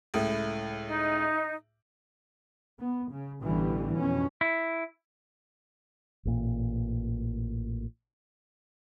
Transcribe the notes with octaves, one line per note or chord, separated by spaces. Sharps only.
C#2 A2
D#4
B3
C#3
A1 B2 D3 E3 G3
F2 B2 C#4
E4
A1 A#2